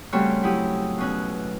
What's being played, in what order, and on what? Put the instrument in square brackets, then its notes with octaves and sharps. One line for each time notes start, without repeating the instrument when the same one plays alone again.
[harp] C#3 G3 A3 C4 F#4 C#5
F#3 E4 G4 D#6
B2 C#4 F#6